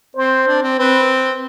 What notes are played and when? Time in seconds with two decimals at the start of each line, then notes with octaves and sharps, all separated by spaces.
0.15 C4 C5
0.47 D4
0.63 C4
0.78 C4 B4